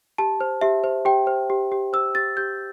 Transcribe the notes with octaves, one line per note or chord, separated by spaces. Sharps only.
G4 A5
C5
G4 E5
C5
G4 G5
C5
G4
G4
C5 E6
G4 A6
G4 G6